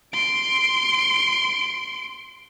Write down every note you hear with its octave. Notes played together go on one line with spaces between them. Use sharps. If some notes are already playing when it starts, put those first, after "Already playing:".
C6 D7